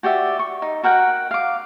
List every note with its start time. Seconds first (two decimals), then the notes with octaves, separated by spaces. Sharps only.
0.03 F#4 G4 D5 E5
0.39 C#6
0.62 D#4
0.83 F#4 A#4 F#5 G5
1.31 F5 D6